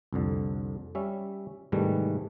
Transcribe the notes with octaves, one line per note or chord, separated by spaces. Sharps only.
C2 F2 D3
G3 C#4 E5
G#2 C3 D#3 E3 G3 A3